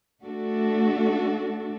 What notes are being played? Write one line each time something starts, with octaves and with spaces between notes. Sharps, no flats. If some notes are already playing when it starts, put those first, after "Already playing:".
A3 D4 F#4 A4